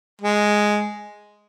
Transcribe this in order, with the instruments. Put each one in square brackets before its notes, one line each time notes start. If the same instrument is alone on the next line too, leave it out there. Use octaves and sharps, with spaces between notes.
[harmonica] G#3